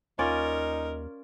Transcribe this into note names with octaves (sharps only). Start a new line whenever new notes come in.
D#2 C#4 D#4 F4 A#4 D5